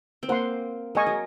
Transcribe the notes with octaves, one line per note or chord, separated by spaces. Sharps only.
C4
A#3 C5 F#5 C6
G#3 A#4 D#5 G#5 C#6
F#3